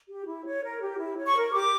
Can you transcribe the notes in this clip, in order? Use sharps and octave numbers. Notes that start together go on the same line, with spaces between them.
G4
E4
C#5
A#4
G4
E4
C#5
C#6
A#4
G4 D6